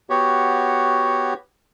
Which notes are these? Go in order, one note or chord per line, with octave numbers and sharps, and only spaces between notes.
B3 F#4 G4 C#5